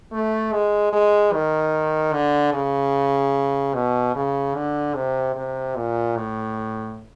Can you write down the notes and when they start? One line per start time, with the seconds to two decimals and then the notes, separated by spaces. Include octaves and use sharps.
0.12 A3
0.53 G#3
0.93 G#3
1.33 D#3
2.13 D3
2.53 C#3
3.74 B2
4.15 C#3
4.55 D3
4.95 C3
5.35 C3
5.76 A#2
6.16 A2